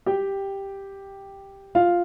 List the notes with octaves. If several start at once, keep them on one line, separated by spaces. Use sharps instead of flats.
G4 G5
F4 F5